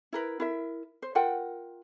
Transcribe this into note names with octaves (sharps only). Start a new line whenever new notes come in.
E4 A#4 B4
E4 A#4 E5
C5
F4 A#4 F#5 G5